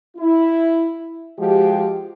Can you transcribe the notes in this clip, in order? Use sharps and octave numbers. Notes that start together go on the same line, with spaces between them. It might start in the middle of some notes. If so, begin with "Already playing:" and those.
E4
F3 G#3 F#4 G4